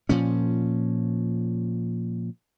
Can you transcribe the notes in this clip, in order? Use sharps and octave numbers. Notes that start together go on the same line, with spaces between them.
A#2 F3 C#4